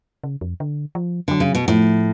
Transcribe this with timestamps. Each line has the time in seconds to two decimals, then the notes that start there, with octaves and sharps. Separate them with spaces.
0.24 C#3
0.41 F2
0.60 D3
0.95 F3
1.28 D3 F#3
1.40 C#3
1.55 B2
1.68 A2 F3